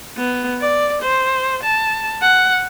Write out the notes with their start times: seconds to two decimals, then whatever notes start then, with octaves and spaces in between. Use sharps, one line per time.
0.17 B3
0.61 D5
1.02 C5
1.63 A5
2.22 F#5